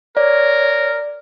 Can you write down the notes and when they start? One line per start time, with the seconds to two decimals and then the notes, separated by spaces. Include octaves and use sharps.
0.17 A#4 C#5 D5